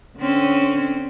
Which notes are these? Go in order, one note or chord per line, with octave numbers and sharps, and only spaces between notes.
D3 C4 C#4